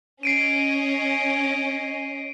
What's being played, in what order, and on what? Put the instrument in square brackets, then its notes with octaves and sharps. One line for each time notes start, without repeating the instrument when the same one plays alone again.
[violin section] C#4 D#5 [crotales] C7 D7 D#7